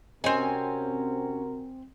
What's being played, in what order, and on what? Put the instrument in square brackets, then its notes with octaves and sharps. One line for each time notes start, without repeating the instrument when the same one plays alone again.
[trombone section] C3 F#4 A#4 [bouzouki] C4 G#5 [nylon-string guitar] C#4 C#5 D#5